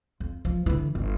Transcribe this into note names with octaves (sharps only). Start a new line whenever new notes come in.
F2
F3
D3 E3
G1